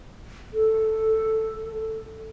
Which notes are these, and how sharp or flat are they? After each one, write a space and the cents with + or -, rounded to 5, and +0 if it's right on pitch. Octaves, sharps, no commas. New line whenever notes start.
A4 +0